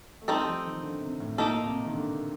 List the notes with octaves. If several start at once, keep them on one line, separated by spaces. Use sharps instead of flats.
A3
G3 C4 D#4 A4
F3
D#3
D3
C3
A2
A#2 A#3 D#4 A4
C3
D#3
D3